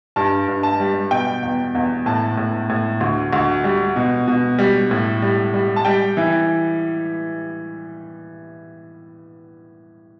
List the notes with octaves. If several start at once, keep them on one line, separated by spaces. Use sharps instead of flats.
G2 A5
G2
A5
G3
B2 G5
E2
E2
A2 A5
A2
A2
D2
D2
G3
B2
B2
G3
A2
G3
G3
A5
G3 G5
E3